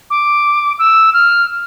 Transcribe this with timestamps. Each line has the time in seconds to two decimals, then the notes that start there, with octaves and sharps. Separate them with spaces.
0.10 D6
0.79 E6
1.14 F6